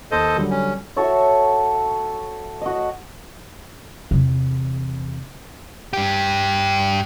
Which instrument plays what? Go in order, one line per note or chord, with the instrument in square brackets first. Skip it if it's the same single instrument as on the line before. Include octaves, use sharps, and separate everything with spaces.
[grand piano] D#2 [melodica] A4 C5 D#5
[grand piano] D3 F#3 G3
[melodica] C#4
[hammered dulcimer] F#4 A4 C#5 E5
F#4 D#5
[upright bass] E2 C3
[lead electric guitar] G2 G4